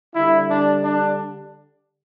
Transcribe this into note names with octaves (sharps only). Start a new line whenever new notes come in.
D3 G3 E4
D4
D4